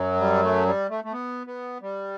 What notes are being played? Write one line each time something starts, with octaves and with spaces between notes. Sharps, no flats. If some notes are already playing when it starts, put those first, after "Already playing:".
Already playing: F#2 F#3
G3
A3
G3
A3
A3
B3
B3
G3